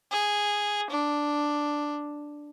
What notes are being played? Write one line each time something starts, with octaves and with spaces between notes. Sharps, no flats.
G#4
D4